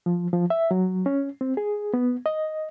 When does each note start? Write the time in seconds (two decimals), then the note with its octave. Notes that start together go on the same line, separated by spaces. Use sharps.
0.06 F3
0.33 F3
0.50 E5
0.71 F#3
1.06 C#4
1.41 C4
1.57 G#4
1.94 B3
2.26 D#5